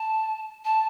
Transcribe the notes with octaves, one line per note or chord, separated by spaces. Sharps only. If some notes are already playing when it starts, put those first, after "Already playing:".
Already playing: A5
A5